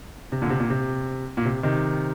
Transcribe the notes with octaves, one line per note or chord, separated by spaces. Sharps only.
C3
A#2 D3
C3
A#2
C3
A#2
C3
C3 D#3